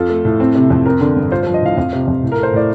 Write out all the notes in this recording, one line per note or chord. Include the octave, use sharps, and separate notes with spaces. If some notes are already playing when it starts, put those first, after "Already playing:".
Already playing: F2 F4 A4
A3
A2
C4
C3
F2
C4 A#4
D3
G2
F4 C5
C5
F3
D#5
A2 F5
F2 F5
C3
F2
A2
A#4
A3
C5
A2 D5